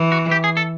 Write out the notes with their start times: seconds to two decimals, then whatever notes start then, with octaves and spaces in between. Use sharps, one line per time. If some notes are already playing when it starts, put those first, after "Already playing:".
Already playing: E3
0.12 F#4
0.31 G4
0.44 G#4
0.57 A4